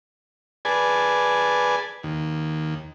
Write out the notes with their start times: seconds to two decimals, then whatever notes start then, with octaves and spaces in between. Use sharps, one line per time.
0.65 G#4 B4 D5 G#5 A5
2.03 D#2